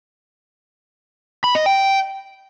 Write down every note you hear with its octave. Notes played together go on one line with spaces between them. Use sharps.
B5
D#5
G5